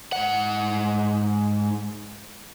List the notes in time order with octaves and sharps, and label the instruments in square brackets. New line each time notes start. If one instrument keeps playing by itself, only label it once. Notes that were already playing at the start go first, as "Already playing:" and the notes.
[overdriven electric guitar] G#2 F#5